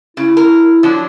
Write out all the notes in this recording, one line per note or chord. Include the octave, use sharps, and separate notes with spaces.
C#3 E4
A#4
F3 F#3 D4